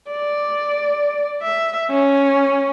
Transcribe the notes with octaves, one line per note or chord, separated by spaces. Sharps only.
D5
E5
C#4